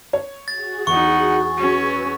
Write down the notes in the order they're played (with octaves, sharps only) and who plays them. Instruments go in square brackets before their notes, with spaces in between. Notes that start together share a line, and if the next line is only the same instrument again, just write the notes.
[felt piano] C#5
[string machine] F#4 G#4 [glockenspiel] A6
[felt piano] E2 [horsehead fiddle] D#4 F#5 [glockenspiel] C#6
[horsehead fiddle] C#4 [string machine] B4 E6